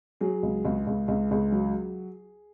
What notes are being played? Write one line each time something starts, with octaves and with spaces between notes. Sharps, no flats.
F#3 G#4
C#2
C#2
C#2
C#2
C#2
F#3